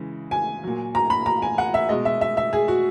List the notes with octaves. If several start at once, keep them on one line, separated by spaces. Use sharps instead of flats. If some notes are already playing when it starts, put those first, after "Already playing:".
Already playing: C#3 E3 G#3
G#5
A#2 F#3
A#5
B5
A#5
G#5
F#5
E5
B2 G#3 D#5
E5
E5
E5
G#4
F#4